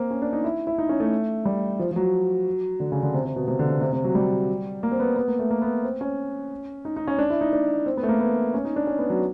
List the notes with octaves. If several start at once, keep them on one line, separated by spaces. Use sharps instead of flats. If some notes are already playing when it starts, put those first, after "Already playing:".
Already playing: A#3 C4
C#4
D4
D#4
E4
E4
D#4
C#4
A3
G3
F3
F3
F#3
D3
C#3
D3
C3
C3
B2
C3
D3
C3
C3
C3
F#3
G3
A#3
C4
B3
B3
A#3
A3
A#3
B3
C4
C#4
D#4
D#4
C#4
D4
E4
D#4
D4
C4
B3
A3
A#3
B3
C#4
D#4
D4
C#4
B3
F#3